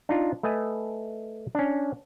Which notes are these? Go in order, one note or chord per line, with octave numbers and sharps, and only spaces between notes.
D4 D#4 F4
A3 B4 D#5 G#5
C#4 D4